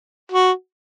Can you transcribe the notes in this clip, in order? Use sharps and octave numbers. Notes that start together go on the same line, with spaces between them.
F#4